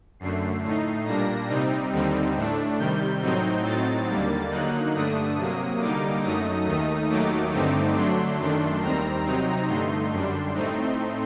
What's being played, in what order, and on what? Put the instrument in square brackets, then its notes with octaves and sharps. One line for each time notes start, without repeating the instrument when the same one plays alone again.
[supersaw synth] F#2 D3 A3 C7
A2 A3 D#4
A#2 G3 A#3 D4 A#6
C3 G3 C4 D#4
D#2 D3 G3 C4 D#4
A2 A3 D4
C3 D#3 G3 G6
A2 F#3 C4 D#4
A2 F#3 C4 D#4 A6
D#2 D3 G3 A#3
D3 F#3 A#3 D#4 F#6
G2 D3 A3 D4 D#6
C3 F#3 A#3
D3 G3 A#3 D#4 D6
F#2 F#3 A3 D#4 D#6
D#2 D#3 A3 D#4
D#2 D#3 F#3 A3 D#4 D6
G2 D3 A3 C4 D#4
D3 F#3 A3 D4 C6
F#2 D#3 A3 D4
D#2 D#3 G3 C4 A#5
C3 F#3 C4 D#4
G2 D3 A3 D#4 C6
F#2 D3 G3 D4
A2 A3 C4 D#4